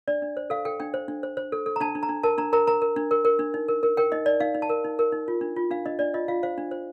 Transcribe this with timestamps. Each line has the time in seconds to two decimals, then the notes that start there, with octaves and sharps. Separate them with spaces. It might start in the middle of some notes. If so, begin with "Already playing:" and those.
0.08 D4 D5
0.22 D4
0.37 C5
0.50 A4 F5
0.65 A4 G5
0.80 D4 G5
0.94 C5
1.08 D4
1.23 C5
1.37 C5
1.52 A4
1.66 A4
1.76 A#5
1.81 D4 A5
1.95 D4
2.03 A#5
2.09 D4
2.23 A#4 A5
2.38 D4 A#5
2.53 A#4 A#5
2.67 A#4 A#5
2.82 A#4
2.96 D4
3.11 A#4
3.25 A#4
3.39 D4
3.54 D#4
3.68 A#4
3.83 A#4
3.97 A#4 G5
4.12 D#4 D#5
4.26 D#4 D5
4.40 D#4 F5
4.55 D#4
4.62 A5
4.69 A#4
4.85 D#4
4.99 A#4
5.12 D#4
5.28 F4
5.41 D4
5.56 F4
5.71 D4 F5
5.86 D4 D#5
5.99 D4 D5
6.14 F4 D#5
6.28 F4 F5
6.43 C5 F5
6.58 D4
6.71 C5